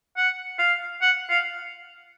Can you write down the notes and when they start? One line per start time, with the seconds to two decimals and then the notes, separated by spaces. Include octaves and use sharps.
0.17 F#5
0.59 F5
1.02 F#5
1.30 F5